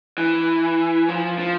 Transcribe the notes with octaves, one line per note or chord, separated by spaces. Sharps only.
E3
F3
F3